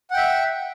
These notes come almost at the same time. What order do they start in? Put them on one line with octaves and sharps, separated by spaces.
F#5 G5 E5